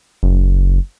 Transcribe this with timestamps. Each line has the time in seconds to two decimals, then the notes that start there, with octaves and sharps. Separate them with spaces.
0.23 F#1